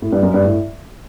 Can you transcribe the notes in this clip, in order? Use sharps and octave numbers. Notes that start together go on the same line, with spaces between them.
A2
G2
F#2
G2
A2